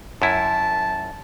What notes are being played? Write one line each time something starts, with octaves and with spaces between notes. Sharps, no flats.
F#2 E4 A5